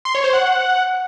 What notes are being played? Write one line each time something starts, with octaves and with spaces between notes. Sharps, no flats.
C6
C#5
C5
F#5